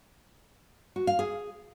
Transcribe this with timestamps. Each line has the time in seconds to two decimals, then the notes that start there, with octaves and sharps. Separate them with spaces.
0.96 F#4
1.07 F5
1.19 G#4